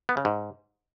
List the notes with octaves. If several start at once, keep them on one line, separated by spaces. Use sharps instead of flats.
B3
C#3
G#2